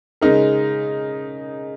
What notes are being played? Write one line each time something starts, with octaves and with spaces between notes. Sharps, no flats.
C#3 G#3 D#4 A#4